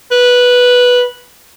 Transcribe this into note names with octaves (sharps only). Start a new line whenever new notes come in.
B4